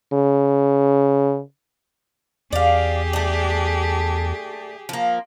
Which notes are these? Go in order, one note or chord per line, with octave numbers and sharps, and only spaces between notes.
C#3
E2 G4 G#4 D5 F5
A3 D4
F3 A#3